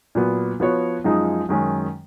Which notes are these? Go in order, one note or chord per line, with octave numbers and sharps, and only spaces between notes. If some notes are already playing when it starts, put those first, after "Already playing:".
A#2 F#3 B3
F3 B3 F#4 C#5
F#2 F3 G#3 D#4 G#4
F#2 D#3 G#3 C#4